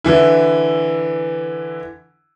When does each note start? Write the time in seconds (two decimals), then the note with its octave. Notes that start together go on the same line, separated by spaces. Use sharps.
0.04 D3 E3 E4